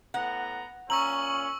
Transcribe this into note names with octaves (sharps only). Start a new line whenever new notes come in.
A2 B3 F#5 A#5
A#2 C#4 A#5 C#6 E6 F#7